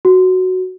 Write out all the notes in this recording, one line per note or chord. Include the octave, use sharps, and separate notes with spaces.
F#4